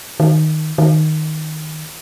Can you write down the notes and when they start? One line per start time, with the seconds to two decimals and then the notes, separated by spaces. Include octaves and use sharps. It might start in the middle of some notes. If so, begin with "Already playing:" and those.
0.20 D#3
0.78 D#3